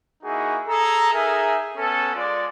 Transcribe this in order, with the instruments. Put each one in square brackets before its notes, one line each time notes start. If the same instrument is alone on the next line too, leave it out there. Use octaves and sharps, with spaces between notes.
[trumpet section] A#3 D#4 E4 F#4 G#4
G#4 A4 A#5
D#4 G#4 A#4 E5
B3 C#4 A4
G#3 F4 D5